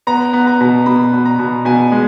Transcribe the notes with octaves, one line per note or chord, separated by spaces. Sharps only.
B3 A#5
B3
A#5
B2
B2 B5
B2
A#5
B2
B2 G#5
G#3